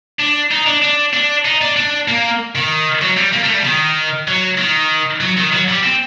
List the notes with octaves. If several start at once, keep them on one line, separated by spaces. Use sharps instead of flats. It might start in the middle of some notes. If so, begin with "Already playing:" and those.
D4
D#4
D4
D4
D4
D#4
D4
D4
A#3
D#3
F#3
G3
A#3
A3
G3
D#3
F#3
D#3
F#3
D#3
F#3
G3
C4